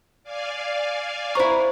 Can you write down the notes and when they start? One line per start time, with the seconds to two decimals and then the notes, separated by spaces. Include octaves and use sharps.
0.23 D5 F5 G#5
1.35 E4 C5 A#5 C#6